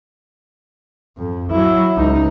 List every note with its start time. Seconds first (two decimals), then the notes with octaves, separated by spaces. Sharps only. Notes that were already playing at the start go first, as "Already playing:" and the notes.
1.18 F2
1.51 F#3 E4
1.97 C#2 D#4